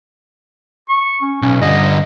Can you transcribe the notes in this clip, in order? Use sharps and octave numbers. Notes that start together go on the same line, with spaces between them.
C#6
C#4
B1 C#4
G2 D3 D#5